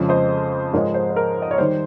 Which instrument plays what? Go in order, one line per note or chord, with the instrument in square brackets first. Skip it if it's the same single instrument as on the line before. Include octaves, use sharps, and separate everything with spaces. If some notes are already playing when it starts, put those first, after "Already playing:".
Already playing: [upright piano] F2 C#3 F3 G#3
C5 D#5
G#2 F3 G#3 A#4 C#5
C5
C5
A#4
D#5
C#5
D#3 G3 C5